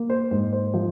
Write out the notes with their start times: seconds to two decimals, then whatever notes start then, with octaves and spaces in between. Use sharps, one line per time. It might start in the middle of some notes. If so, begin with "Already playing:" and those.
Already playing: A#3
0.10 C5
0.31 G#2 C5
0.53 C5
0.74 F3